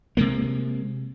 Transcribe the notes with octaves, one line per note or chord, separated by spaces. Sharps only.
C3 G#3 A#3